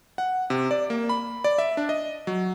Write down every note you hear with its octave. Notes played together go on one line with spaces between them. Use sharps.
F#5
C3
D5
A#3
B5
D5
E5
D4
D#5
F#3